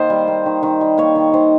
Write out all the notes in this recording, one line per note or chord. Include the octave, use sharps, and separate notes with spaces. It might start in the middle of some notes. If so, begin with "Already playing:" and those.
Already playing: D#3 A#3 C5 D#5
G3
A#3
D#3
D#3
G3
A#3 C#5
D#3
D#3 C5